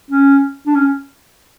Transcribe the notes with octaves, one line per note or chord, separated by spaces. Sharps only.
C#4
D4
C#4